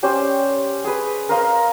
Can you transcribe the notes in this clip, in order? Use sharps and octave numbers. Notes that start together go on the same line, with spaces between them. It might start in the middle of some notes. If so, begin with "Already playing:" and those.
C#4 G4 C5 D5
G#4 B4
A#4 C5 D#5 F5